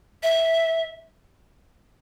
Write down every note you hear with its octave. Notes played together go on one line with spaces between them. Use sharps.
E5